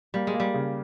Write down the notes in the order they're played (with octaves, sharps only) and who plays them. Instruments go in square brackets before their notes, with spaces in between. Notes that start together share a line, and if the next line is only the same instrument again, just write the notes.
[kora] G3 [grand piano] A#3
[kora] G#3
[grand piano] A#3
[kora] G3
[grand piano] C#3